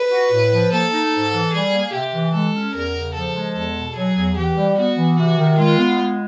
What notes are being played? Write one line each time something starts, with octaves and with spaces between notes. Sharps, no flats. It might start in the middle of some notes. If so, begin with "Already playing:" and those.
Already playing: B4
F#4
A2
F3
A#3 A4
D#4
G#2
E3
G3 G#4
A#3
C3 G4
E3
G#3 A4
C#4
E2 A#4
C#3
F3 A4
G#3
E2 A4
B2
F#3 G#4
E2
E3 G4
G3
B3 F#4
E3
C3 F#4
D#3
G#3 F4
B3
G#3